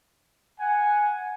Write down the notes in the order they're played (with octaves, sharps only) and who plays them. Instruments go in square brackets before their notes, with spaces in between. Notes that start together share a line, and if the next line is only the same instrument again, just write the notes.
[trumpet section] F#5 G#5